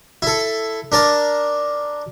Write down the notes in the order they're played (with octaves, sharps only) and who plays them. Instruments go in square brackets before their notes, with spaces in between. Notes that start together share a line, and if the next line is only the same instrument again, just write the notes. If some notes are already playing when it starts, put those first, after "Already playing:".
[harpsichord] E4 A4
D4 A#4 A5